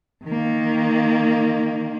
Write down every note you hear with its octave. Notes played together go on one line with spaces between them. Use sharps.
D#3 A#3